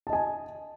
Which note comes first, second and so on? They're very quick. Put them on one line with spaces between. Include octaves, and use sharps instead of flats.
A5 D#5 G#5